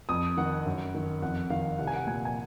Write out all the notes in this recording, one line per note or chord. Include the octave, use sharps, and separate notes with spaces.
F2 D#6
D#3 F#5
F#2
D#3
F2 F#5
D#3 F5
C2 F#5
G#5
F#5
A#2 G#5
G#5